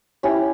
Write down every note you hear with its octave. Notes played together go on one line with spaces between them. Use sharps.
C#4 E4 G4